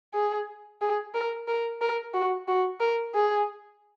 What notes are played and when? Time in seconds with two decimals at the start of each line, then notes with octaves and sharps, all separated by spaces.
0.14 G#4
0.81 G#4
1.14 A#4
1.48 A#4
1.81 A#4
2.14 F#4
2.48 F#4
2.80 A#4
3.15 G#4